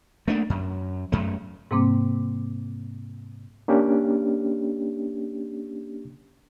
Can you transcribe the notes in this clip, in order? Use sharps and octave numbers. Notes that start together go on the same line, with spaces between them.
A3 A#3 D4
F#2
F#2 A3
G#2 C3 G3 A#3 C4 D6
A#3 C#4 D4 G4